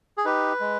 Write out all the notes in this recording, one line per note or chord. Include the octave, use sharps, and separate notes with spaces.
G#4
D#4 G4 B4
G#3